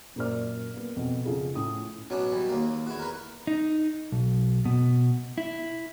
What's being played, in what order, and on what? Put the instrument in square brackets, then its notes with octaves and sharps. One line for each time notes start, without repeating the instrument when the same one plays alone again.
[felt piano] F#2 A#2 A#4 C5 D5 F6
A#3 B3
F2 B2
C#3 F3 F4 G#4 A4
A2 C#4 D#6
[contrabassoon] B2 [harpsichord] F#3 C#4 D4
[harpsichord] E3 G3
D#2 A#3
[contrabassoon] E2 [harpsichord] E4 F#4
[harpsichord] A#4 B4
[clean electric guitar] D#4
B1
B2
E4